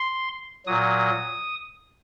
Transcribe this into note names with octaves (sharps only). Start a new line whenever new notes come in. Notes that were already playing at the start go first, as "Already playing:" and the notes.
Already playing: C6
A#2 F#3 D#6